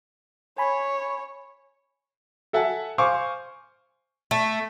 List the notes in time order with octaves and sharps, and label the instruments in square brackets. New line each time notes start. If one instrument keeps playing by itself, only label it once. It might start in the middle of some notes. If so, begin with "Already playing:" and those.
[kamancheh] C#5 [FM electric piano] G#5 B5
[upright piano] A4 E5 F#5 G#5 A5
C5 F5 G#5 C#6 D6
[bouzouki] A3